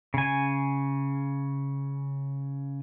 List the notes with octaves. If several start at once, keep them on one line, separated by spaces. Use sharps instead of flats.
C#3 G#5